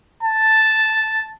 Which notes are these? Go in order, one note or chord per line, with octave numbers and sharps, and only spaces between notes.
A5